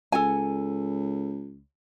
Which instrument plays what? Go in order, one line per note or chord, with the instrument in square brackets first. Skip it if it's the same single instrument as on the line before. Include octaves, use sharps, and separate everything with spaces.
[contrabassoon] C#2 [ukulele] A4 G#5